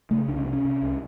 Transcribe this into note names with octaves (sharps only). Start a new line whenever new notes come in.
C#3 A3
C2 D4
C#4
C3 C4
C#4
C3
C2